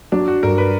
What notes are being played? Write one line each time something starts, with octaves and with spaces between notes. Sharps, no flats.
F#3 D4
F#4
G2 A#4
B4